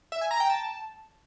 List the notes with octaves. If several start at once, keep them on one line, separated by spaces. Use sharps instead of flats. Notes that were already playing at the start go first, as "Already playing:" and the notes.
E5
G#5
A#5
G5
A5